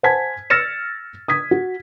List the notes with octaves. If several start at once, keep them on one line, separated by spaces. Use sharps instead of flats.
C5 F#5 G#5 A5 G#6 B6
E6 F6 A6 A#6 C#7 E7
D#6 G#6 B6
F#4